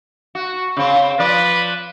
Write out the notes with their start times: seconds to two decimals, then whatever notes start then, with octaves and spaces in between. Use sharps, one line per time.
0.35 F#4
0.77 C#3 C4
1.19 F3 B4 D5